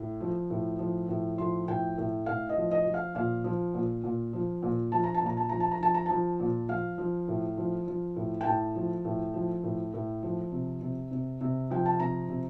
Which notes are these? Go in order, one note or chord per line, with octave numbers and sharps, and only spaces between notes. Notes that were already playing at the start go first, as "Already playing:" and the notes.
Already playing: A2
F3
A2
F3
A2
F3 C6
A2 G5
A2
A2 F5
D#5
F3
D#5
F3
F5
A#2 F5
F3
A#2
A#2
F3
A#2
F3 A5
A#5
A5
A#2 A#5
A5
F3 A#5
A5
A#5
F3 A5
A#5
F3 A5
A#2
F3 F5
F3
A2
F3
F3
A2
G5
A2 A5
F3
A2
F3
A2
A2
F3
C3
C3
C3
C3
F3 G5
A5
C3 A#5
C3